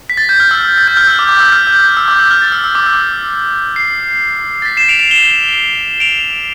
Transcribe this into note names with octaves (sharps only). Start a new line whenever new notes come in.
B6
A6
G6
F6
E6
A6
G6
F6
E6
D6
D6
E6
F6
G6
F6
E6
D6
E6
F6
A6
E6
E6
D6
E6
C7
A6
B6
C7 E7
D7 F7
D7 F7
E7 G7
D7 F7